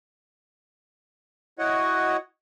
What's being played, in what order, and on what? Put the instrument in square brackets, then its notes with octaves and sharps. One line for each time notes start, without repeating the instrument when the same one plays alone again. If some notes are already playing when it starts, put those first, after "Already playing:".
[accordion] E4 F#4 C#5 D#5 F#5